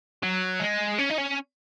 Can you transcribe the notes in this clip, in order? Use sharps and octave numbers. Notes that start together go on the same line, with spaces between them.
F#3
G#3
C#4
D#4
C#4